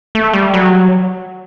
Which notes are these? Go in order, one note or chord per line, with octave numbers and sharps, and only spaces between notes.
A3
G3
F#3